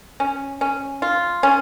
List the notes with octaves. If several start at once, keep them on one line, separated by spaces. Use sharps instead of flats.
C#4
C#4
F4
C#4